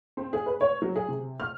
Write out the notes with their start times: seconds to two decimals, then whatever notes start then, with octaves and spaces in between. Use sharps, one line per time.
0.17 C4
0.33 G#4
0.46 B4
0.61 C#5
0.82 F#3
0.96 G#4
1.08 C3
1.40 F6